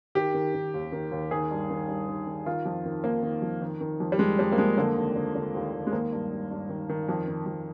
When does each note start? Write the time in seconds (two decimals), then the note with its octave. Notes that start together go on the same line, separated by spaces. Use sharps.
0.15 D#3 G4
0.34 D#3
0.54 D#3
0.74 D#2
0.92 D#3
1.12 D#2
1.31 D#3 G#4
1.51 G2
1.70 D#3
1.88 G2
2.08 D#3
2.27 D#3
2.46 D#3 F4
2.66 F2
2.86 D#3
3.04 D#3 A#3
3.23 D#3
3.42 F2
3.62 D#3
3.81 D#3
4.00 F2
4.12 G3
4.19 F2 G#3
4.39 F2 G3
4.52 A#3
4.58 F2 G#3
4.77 D3 A#3
4.96 D#2
5.16 D3
5.35 D3
5.55 D#2
5.73 D#2
5.87 G#3
5.93 D#3 A#3
6.12 G2
6.31 G2
6.51 G2
6.69 D#3
6.89 D#3
7.09 F2
7.28 D#3
7.46 F2